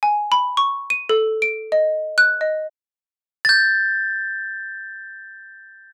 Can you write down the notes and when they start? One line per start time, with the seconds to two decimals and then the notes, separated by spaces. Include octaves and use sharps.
0.03 G#5
0.32 B5
0.57 C#6
0.90 D#7
1.09 A4
1.42 D7
1.72 D#5
2.18 F#6
2.41 D#5
3.45 G6 A6